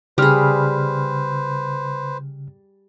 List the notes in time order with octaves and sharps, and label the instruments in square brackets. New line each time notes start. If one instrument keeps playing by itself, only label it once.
[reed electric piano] C#3 F6 [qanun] G3 G#4 [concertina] B4 C5